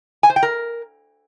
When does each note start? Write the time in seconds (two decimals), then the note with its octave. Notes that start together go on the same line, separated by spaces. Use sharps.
0.23 G#5
0.30 C5
0.36 G5
0.43 A#4